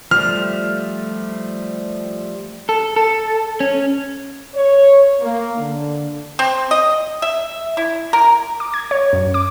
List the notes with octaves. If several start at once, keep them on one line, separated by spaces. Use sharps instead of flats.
F3 G3 A3 F6
A4
A4
C#4
C#5
A#3
D3
C4
D#5
E5
E4
A#4
D6
G#6
C#5
F#2
D6